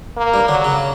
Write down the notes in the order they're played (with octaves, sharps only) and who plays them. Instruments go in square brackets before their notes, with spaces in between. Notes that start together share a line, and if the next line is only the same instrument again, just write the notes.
[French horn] A#3
[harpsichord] G2 G3
[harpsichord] D3 D4 [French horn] F#3
[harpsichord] C#3 C#4